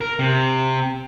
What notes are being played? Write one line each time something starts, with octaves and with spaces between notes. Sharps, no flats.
A#4
C3